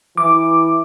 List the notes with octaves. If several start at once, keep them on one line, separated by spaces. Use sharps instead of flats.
E3 D6